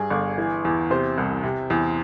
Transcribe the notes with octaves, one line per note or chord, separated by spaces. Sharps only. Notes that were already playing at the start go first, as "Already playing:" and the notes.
Already playing: G2 G#4
G1
E3
E2
C3 C5
C2
C3
E2